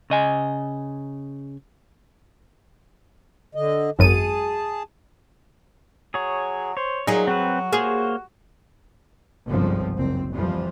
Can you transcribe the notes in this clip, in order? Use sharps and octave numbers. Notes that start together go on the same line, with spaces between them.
C#3 D#5 G#5
D3 D#5
G#1 F#2 G#4 A5 D#7
F#3 G#4 C#5
C5 C#5
A#2 F#3 D#4 G#4
C4 F#4 B4
A#3 G#4 C5 C#5
G1 C2 G#2 C#3 F3 C4
F#1 C4
F2 A#2 E3 F3 G3